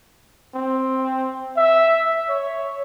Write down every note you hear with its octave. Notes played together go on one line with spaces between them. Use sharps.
C4
E5
C#5